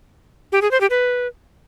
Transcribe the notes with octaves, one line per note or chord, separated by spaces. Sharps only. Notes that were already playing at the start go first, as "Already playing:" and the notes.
G4
G#4
C5
G4
B4